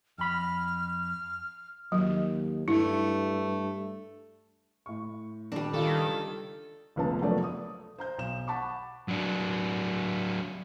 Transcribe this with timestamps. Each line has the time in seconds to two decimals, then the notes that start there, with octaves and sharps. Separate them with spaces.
0.18 F2 B5 F6
1.92 D#2 F#3
2.68 G2 A3 E4
4.86 A2 C#6
5.52 D#1 G3 D4
5.73 C#2 D#3 F4 A4 C#6
6.96 F1 C#2 B3 A5
7.21 F3 F#3 A3 B3 A#4 D5
7.44 D#6
7.98 C5 A#5 G6
8.18 B1 E7
8.47 F#5 A5 B5 C#6 D6
9.08 F#3 D4